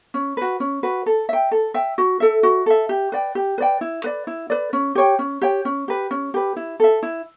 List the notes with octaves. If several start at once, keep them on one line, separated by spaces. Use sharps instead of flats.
C#4
F#4 B4
C#4
F#4 B4
A4
E5 G5
A4
E5 G5
F#4
A4 E5
F#4
A4 E5
G4
B4 D5 G5
G4
B4 D5 G5
E4
B4 D5
E4
B4 D5
C#4
G4 C#5 G5
C#4
G4 C#5 G5
C#4
G4 B4
C#4
G4 B4
E4
A4 E5
E4